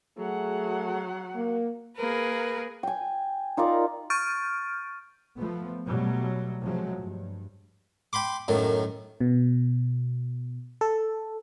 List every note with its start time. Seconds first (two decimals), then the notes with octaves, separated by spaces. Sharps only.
0.18 F#3 A3 G#4 F#5
1.35 A#3
1.98 A#3 G#4 A#4 B4
2.83 G5 G#5
3.57 D#4 F4 A#4 D5
4.10 C#6 F6 G6 A6 D7 D#7
5.35 F3 A3 B3
5.85 B2 F#3 G3 A3
6.62 C3 F3 F#3 G#3 A3
6.99 G2
8.13 G5 B5 C6 D6
8.48 F#2 A2 D#3
9.21 B2
10.81 A4